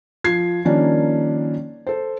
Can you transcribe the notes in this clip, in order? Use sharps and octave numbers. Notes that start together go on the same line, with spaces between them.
F3 G#6 C7
D#3 F3 G3 A#3 C#4 D4
A4 C5